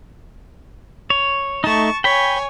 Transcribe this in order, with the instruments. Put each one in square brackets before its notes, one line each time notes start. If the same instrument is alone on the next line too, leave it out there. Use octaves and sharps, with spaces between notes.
[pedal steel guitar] C#5
[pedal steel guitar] A3 D#4 [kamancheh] A5 C#6
[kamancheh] C#5 G#5 [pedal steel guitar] G5 B5